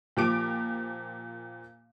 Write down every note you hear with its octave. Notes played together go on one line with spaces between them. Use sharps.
A#2 F3 G4 D6 D7